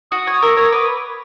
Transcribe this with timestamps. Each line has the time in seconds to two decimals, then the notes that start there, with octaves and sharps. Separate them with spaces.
0.11 F#4 D#6
0.27 C#5
0.42 A#4 E6
0.57 C#5 D#6
0.72 B4 D6